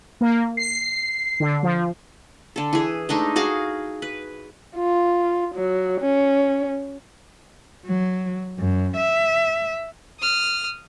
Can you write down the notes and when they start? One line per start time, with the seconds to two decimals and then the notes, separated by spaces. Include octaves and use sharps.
0.21 A#3
0.57 C7
1.40 D3
1.63 F3
2.56 D3 A4
2.73 E3 G#4
3.09 G#3 A3 D4 D#4
3.36 F#4 G#4 D#5 F5
4.02 B4
4.76 F4
5.55 F#3
6.01 C#4
7.84 F#3
8.58 F#2
8.96 E5
10.20 D#6 F6